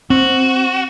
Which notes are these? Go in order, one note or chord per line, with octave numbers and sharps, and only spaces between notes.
C4 F#4